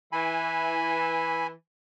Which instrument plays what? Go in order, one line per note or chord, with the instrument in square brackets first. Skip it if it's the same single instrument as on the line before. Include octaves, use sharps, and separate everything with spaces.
[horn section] E3 [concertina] G#5 B5